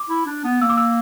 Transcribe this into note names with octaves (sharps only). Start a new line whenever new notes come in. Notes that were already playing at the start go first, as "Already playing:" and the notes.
Already playing: D6
E4
D4
B3
A#3 E6
D6
E6